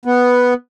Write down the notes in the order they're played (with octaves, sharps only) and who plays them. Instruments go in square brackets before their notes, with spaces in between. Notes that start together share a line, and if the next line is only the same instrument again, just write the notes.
[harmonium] B3